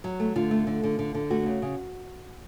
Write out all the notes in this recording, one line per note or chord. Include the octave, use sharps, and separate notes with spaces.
F#3
A3
D3 F4
A3
D3
D3
D3
D3
A3 F#4
C#3
C#3